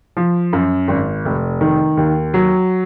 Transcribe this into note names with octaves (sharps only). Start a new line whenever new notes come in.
F3
F#2
G#1
F1
D#3
D#2
F#3